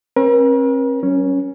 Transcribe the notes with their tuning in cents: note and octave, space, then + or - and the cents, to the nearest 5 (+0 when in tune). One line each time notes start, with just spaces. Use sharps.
C4 +45 A#4 +45
F#3 +40 C#4 +0